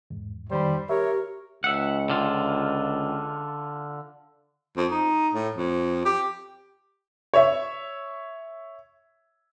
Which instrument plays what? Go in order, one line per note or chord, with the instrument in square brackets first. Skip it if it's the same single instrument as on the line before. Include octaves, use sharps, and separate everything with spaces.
[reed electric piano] E2 G#2
[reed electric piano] F2 D#3 B5 [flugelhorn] G3 [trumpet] C5
[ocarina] G4 [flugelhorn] A#4 [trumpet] C#5 [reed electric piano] E5
[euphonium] C#2 [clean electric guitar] E5 F#5
[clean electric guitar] D3 F4
[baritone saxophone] F2
D#4
A2
F2
G4
[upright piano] C#5 E5